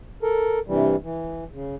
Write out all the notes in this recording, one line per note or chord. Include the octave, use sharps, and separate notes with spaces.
A4 A#4
G2 C3 E3 G3
E3
C#3